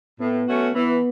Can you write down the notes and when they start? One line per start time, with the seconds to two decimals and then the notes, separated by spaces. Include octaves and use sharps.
0.20 A2 B3
0.47 F#3 A3 C#4 F#4
0.75 E3 B3